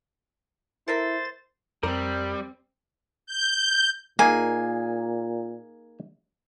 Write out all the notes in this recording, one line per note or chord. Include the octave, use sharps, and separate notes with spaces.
E4 A4 A#4 C5 E5 A6
F2 G3 C4 A#4
G6
A#2 A#3 D#4 G#4 G#5